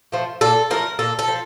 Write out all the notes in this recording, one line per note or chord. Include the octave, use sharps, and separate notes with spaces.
F3 A3
A#2 A4
F3 A3 A#4
A#2 A4
A4
F3